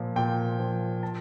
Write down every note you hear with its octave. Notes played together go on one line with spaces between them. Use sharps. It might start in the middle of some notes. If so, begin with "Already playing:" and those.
Already playing: A#2 F3
A#2 G5
F3
A5